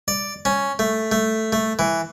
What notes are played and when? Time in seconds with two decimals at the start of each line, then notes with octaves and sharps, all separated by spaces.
0.08 D5
0.45 C#4
0.79 A3
1.12 A3
1.53 A3
1.79 E3